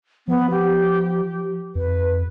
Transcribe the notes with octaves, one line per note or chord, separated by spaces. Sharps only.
F3 B3
G4
F2 B4